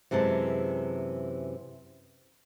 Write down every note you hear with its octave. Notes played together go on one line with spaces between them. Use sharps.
F#2 C3 E3 G#3 A5